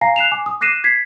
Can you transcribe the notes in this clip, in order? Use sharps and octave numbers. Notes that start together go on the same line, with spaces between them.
F5 G#5 A#5 A#6 C7
F#6 C7 E7 F7
G#5 D6
D#6
D6 F#6 A#6 C7 D#7 E7
G#6 B6 C7